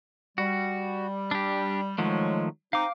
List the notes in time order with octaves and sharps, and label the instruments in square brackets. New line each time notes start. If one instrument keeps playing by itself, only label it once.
[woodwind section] G3 [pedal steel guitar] F#4
[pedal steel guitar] D4 G4
[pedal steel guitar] D#3 F3 A3 [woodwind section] F#3 G#3
[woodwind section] C4 D#4 [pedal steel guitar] F5 D6